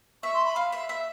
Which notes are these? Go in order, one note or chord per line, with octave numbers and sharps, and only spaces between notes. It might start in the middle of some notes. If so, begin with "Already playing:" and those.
E5 C#6
C6
B5
F5
E5
E5